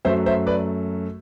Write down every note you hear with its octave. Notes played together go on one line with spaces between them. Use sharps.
F#2 F#3 A3 C5 E5
C5 E5
B4 D5